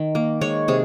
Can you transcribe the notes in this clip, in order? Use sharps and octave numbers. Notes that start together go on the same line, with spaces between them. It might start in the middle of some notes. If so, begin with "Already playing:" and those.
Already playing: D#3
A#3
G#3 C#5
C3 G#4